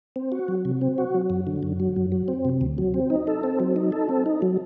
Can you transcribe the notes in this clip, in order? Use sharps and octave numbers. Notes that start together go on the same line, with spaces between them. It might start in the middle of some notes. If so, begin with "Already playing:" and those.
C4
F#4
F#3
C3
C4
F#4
F#3
F#2
D3
F#2
F#3
F#2
F#3
C4
C3
D2
F#3
C4
D#4
A4
C4
F#3
D#4
A4
C4
D#4
F#3